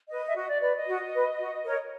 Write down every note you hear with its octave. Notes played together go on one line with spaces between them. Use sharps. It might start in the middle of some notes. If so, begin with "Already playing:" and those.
B4 D#5
E5
F#4 D#5
D5
B4 D5
D#5
F#4
B4
F#4
A#4 C#5